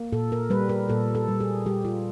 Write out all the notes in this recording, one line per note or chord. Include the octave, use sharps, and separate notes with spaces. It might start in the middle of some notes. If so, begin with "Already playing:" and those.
Already playing: A#3
A#2 A4
A#4
G3 B4
A#4
A#2 A4
A4
G3
G#4
G3 G4
F4